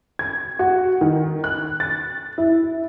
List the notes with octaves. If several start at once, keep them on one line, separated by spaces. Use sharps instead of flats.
G#6
F#4
D#3
F#6
A6
E4